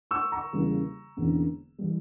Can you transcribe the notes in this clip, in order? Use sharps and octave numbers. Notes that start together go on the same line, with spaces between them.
C#6 E6
A#5 C#6
E2 C#3 G3 A#3 C#4
E1 E2 D3 A#3 C#4
E3 G3